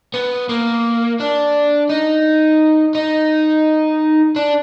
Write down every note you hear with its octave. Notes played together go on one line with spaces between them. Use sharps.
B3
A#3
D4
D#4
D#4
D4